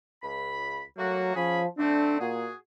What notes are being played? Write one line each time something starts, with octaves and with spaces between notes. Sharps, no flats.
C#2 B5
F#3 A3 A#3 F#4
F3 C#4 G#4 B5
D3 A3 C4 D4
A#2 F#4 G#4